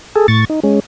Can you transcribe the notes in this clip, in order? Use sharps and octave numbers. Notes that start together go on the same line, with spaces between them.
G#4 A4
A2 C#6 A6
D#4
G#3 C#4